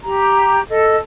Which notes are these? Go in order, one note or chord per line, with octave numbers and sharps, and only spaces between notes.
G4 A#5
A4 D#5